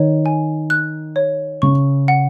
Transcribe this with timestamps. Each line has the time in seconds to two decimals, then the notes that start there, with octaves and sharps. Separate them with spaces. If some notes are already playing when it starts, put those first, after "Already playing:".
Already playing: D#3 C#5
0.26 G#5
0.70 F#6
1.16 C#5
1.62 C#3 C#6
2.08 F#5